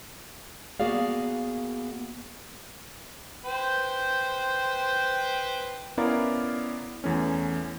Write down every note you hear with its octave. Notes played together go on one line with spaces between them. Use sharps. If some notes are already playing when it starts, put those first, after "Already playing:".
A#3 B3 F#4 G#4 D5 F5
B4 C5 G5
B3 C#4 E4 A#4 D5 F5
E2 E3 A3 C#4